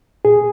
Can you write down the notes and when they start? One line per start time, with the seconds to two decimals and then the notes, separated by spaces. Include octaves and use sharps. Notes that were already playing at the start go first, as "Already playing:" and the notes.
0.25 A#2 G#4